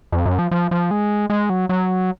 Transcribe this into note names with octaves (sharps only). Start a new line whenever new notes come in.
F2
F#2
F3
F3
F3
G#3
G#3
F#3
F#3